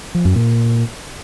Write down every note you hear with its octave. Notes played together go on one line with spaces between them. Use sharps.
F3
F#2
A#2